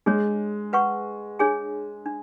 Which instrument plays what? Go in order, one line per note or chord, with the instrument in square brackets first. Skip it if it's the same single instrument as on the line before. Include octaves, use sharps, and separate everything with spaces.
[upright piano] G#3 [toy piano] D4 G#4 C#5
[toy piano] B4 F#5 C#6
D4 G#4 C#5 G#5
D4